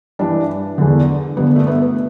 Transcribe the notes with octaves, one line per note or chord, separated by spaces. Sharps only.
G2 E3 D4
E2 D3
G2 D3 B3
A3
B3
B3